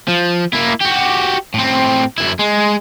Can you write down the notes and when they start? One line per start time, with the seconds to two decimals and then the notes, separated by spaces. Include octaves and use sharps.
0.09 F3
0.53 A#3 E4
0.81 F#4 G4
1.54 A2 C4
2.18 F#2 E4
2.40 G#3